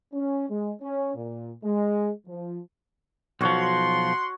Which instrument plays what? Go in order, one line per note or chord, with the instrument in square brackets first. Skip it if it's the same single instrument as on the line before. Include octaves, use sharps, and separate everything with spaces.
[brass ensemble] C#4
G#3
C#4
A#2
G#3
F3
[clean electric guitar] B1 F3 [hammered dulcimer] F#4 C#5 [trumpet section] F#5 C6